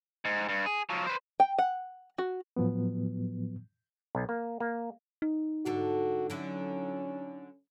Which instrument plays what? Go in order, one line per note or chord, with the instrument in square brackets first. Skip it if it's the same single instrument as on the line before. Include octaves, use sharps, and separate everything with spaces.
[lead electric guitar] G#2
G2
G#4
F3 F#3
B4 C5
[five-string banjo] G5
F#5
F#4
[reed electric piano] A2 F3 F#3 B3
[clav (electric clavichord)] B1
A#3
A#3
[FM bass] D#4
[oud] G#2 D3 A4 [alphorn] F#4
[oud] D3 F#3 E4 [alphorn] C#4